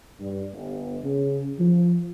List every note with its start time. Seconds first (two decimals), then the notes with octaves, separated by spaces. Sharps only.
0.21 G2
0.53 G1
1.03 C#3
1.59 F3